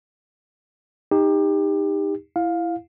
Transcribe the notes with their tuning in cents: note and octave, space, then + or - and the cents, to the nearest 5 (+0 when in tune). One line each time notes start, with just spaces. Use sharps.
D#4 +0 G4 +25
E4 +15 F5 +15